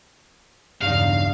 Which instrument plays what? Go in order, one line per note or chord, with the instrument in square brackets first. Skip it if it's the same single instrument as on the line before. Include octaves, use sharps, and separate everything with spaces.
[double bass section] B1 E2 C#3 [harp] G2 D#4 [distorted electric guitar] F5